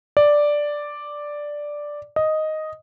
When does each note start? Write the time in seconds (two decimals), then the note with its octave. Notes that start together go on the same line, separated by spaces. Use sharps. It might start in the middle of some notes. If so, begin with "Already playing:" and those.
0.17 D5
2.16 D#5